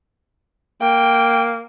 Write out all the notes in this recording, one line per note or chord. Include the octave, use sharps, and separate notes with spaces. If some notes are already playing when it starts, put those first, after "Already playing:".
A#3 G5